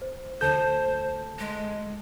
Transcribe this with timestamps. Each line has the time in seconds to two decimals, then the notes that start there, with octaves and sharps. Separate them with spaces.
0.02 C5
0.41 D2 A4 C5 A5 G6
1.39 G#3